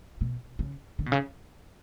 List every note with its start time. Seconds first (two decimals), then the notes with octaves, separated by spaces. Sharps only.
0.21 B2
0.59 C#3
0.99 D3
1.06 B2
1.12 C#3